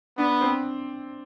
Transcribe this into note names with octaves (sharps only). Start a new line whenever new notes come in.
B3 D4
C4